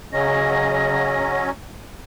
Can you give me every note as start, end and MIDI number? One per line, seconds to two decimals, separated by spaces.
0.13 1.47 49
0.13 1.51 54
0.13 1.51 61
0.13 1.50 75
0.13 1.49 94